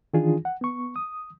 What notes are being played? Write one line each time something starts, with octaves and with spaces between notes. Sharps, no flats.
D#3 E3 D4 F4 G#4
F#5
B3 C#6
D#6